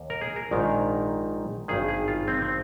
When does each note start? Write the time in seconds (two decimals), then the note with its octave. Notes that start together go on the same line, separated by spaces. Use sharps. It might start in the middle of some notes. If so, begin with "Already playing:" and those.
Already playing: D#2
0.10 A#4
0.21 G#4
0.36 A#4
0.51 A#1 G#2 D#3
1.68 G#1 G2 D#3 G#4
1.88 G#4
2.08 F4
2.28 C4
2.42 C4